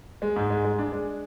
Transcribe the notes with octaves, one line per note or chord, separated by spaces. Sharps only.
G#3
G#2
G#3
G#3
D4
G#3